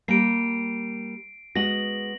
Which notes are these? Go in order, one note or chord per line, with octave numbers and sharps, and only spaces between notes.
G3 A#3 C7 D7
G#3 B3 F#4 A#6 F#7